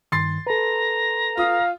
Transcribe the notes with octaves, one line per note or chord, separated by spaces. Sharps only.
G2 D#3 C6 A6 C7
A4 B4 A#5
F4 F5 D#6